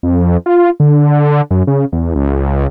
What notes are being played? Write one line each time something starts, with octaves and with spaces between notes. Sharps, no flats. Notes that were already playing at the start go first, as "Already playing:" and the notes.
F2
F4
D3
F#2
C#3
E2
C#2